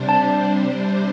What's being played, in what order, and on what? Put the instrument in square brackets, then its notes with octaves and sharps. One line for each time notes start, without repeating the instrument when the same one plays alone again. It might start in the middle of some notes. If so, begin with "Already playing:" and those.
Already playing: [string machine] C3 G3 D4 C5
[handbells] A5